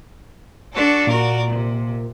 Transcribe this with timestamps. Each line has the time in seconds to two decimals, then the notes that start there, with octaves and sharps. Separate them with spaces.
0.74 D4 F#4 A4
1.07 A#2 F#4 A#4 D5
1.50 C3